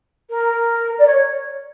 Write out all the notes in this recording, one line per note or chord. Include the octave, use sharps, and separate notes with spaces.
A#4
D5
C#5